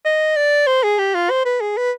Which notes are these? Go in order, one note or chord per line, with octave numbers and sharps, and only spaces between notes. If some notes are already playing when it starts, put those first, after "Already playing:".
D#5
D5
C5
G#4
G4
F4
C5
B4
G#4
B4